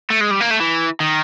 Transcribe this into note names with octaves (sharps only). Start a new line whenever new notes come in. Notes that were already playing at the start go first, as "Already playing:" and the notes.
A3
G#3
G3
A#3
A3
E3
D#3